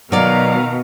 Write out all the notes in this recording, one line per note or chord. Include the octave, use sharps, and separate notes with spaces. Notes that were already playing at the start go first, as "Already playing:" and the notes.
B2 D#3 F#3 D5 F5 A#5